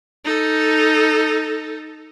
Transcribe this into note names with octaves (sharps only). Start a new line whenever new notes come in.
D#4 A4